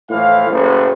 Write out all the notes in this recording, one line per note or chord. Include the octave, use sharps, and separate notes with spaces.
A2 E3 F3 F5
F#1 A2